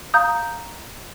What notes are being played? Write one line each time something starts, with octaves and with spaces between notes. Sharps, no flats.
F5 A#5 D#6 G6